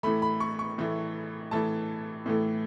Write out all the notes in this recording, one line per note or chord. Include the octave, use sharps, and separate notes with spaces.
A2 E3 A3 B5
B5
C#6
C#6
A2 E3 A3
A2 E3 A3 A5
A2 E3 A3